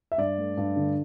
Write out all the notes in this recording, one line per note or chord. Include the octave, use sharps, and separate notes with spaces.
E5
G2 D5
A3
G2
D3